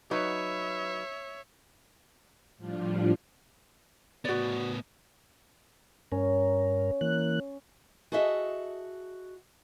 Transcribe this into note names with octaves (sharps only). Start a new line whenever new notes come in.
F#3 D#4 B4 C#5 E5
A2 F3 G3 D4 F4
A2 B3 F#4 D5
G2 C#4 A#4
E3 A#3 F#6
F#4 G#4 A4 D#5 E5